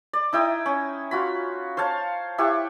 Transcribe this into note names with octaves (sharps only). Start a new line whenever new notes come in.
D5
D#4 E4 G5 D#6
C#4
F4 F#4 B5
C5 C#5 F5 A5
E4 G4 F#5 C#6